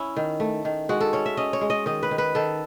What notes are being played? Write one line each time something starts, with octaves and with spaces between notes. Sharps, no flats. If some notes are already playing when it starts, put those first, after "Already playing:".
Already playing: C#4 E4
D#3
A3
D#3
G#3 F#4
A4
C#4 C#5
E5
C#4 D#5
C#5
G#3
D#5
D#3 D#5
B4
D#3
B4
D#3 A4